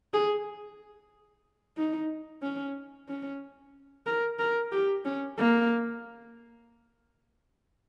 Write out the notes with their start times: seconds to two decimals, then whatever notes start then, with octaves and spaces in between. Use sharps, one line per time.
0.14 G#4
1.77 D#4
2.42 C#4
3.08 C#4
4.07 A#4
4.39 A#4
4.72 G4
5.05 C#4
5.37 A#3